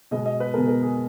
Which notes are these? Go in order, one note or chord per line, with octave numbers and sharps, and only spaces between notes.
B2 G#3 B3 D#5
D#5
B4
B2 G#3 B3 A#4
A#4
G#4